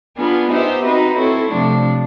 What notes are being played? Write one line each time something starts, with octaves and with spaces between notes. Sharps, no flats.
B3 D4 F4 G#4 B4
B3 D#4 G4 C5 E5
C4 D#4 F#4 B4 D#5
C4 E4 A4 C#5
C3 F3 A3 D4